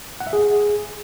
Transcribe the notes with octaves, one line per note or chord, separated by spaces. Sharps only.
F#5
E5
G#4